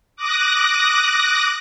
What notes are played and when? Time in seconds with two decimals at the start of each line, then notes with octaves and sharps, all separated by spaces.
0.16 D6 D#6 F#6 A#6